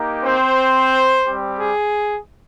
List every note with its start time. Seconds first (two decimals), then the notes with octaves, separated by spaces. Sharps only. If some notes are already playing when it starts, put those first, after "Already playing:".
Already playing: A#3 D#4 G4
0.23 C4 C5
1.25 G3 C4 G4
1.59 G#4